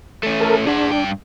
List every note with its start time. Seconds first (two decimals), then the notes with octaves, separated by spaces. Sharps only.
0.23 A3 C#4
0.40 A4 A#4
0.67 D4 G#4 F#5
0.92 G2 G5